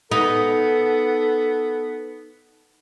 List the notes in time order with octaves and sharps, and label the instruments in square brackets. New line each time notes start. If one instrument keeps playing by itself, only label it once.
[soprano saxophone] B3 [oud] D#4 [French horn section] A4